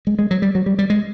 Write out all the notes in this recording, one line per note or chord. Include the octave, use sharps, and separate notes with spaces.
G#3
G#3
F#3
G3
F#3
G3
G3
G#3